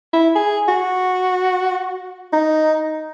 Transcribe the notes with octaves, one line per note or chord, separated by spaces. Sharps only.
E4
G#4
F#4
D#4